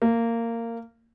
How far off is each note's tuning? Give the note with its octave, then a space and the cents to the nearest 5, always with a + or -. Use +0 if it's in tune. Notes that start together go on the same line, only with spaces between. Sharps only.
A#3 -15